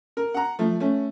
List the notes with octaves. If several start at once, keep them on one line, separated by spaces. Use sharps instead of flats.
A#4
F#5 A#5
F3 A3
A3 C#4